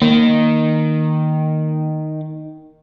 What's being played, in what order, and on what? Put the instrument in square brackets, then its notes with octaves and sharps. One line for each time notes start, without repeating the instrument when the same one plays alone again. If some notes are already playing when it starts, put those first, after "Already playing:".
[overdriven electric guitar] D#3 [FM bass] A#3